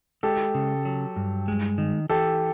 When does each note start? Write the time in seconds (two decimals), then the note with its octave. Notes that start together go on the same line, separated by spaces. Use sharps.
0.23 G#3 G4 A4
0.54 C#3
0.85 F#3
1.16 G2
1.48 G#3
1.78 D#3
2.09 E3 G4 A4